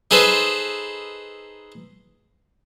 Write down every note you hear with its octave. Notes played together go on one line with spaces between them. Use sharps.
D#4 G#4 A4 B4 C5